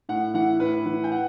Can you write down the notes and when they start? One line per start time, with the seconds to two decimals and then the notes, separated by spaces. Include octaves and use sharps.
0.09 A2 F#5
0.34 E3 F#5
0.60 A2 B4
0.85 E3
1.04 G5
1.12 F#5